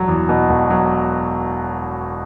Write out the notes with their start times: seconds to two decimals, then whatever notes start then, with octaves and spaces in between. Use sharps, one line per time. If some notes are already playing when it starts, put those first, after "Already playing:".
Already playing: E1 F#3
0.08 E2
0.29 B2
0.49 E1
0.70 F#3